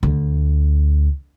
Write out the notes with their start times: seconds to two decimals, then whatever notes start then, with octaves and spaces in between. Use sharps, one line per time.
0.03 D2